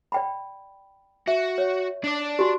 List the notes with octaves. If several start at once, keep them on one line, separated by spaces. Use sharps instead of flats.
D5 G5 B5
F#4 E5
C#5
D4 D5
F#4 G4